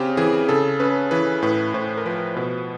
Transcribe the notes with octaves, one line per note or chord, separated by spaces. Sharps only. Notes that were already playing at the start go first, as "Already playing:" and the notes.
Already playing: C#3 C4 G4
E3 G#4
C#3 A4
C#4 B4
E3 B4
A2 B4
A2 C5
A#4
F3 B4
B2 B4